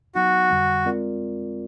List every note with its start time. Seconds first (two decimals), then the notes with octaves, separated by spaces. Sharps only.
0.15 F#3 B3 D#4 F#4
0.51 F2 D3 G3
0.86 G#3 C4 F4 A#4 D5